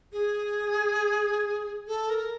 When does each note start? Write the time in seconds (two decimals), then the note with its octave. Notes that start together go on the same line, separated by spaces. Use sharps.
0.13 G#4
1.87 A4
2.10 A#4